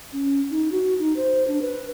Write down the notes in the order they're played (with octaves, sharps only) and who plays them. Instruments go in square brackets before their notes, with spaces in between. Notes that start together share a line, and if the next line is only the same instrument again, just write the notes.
[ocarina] C#4
D#4
F#4
D#4
C5
D4
B4